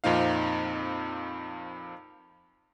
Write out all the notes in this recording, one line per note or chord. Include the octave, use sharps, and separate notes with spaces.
F2 A#2 C4 D#4 F5